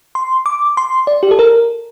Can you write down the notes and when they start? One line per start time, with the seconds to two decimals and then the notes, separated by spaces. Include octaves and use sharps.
0.15 C6
0.46 D6
0.77 C6
1.07 D5
1.23 G4
1.31 A4
1.39 A#4